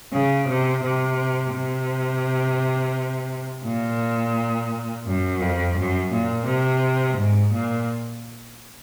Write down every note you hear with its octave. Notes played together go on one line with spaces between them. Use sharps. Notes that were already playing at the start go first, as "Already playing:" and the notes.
C#3
C3
C3
C3
A#2
F#2
F2
F#2
A#2
C3
G#2
A#2